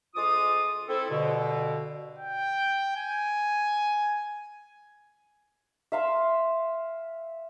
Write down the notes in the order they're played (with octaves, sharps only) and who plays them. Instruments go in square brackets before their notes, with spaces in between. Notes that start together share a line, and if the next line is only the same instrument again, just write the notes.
[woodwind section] D2 G#3 F4 D6 D#6
C4 E4 A4
G2 B2 D3
[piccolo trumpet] G5
G#5
[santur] E5 F5 C6 E6